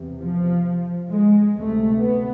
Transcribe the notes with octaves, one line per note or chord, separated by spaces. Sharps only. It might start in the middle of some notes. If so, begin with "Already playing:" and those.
Already playing: E2 C3
F3
G#3
D2 C3 A3
B3